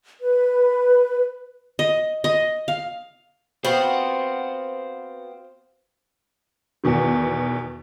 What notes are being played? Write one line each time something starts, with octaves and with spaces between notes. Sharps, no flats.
B4
D#5
D#5
F5
B3 C4 F#4 C5 F5
E2 B2 D#3